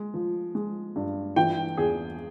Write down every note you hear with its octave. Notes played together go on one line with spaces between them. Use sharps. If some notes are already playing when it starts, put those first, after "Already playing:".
Already playing: G#3
F3
G#3
G2
E3 G5
E2 G#4